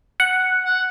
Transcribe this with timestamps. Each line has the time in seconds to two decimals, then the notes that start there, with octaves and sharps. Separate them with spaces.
0.20 F#5
0.65 F#5